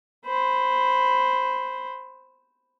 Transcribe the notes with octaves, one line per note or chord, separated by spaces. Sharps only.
C5 B5